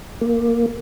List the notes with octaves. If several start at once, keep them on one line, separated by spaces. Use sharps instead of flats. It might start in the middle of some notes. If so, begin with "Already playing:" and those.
A#3